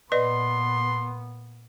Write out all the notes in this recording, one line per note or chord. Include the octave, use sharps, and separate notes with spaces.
A#2 B3 B4 D5 D#5 C6